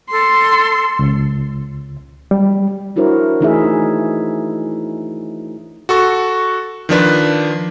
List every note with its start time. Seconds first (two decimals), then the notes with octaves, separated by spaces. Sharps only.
0.11 A4 C6
0.99 C#2
2.31 G3
2.96 D4 E4 F#4 A#4 C5 C#5
3.41 E3 A3 D#4 E4 G#4 E5
5.89 F#4 A4 C#6
6.89 D#3 F3 D4 B4